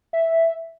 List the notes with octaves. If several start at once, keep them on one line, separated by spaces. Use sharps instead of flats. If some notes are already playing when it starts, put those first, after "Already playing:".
E5